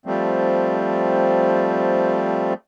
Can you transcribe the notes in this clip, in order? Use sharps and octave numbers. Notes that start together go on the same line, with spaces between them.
F3 G3 A3 C4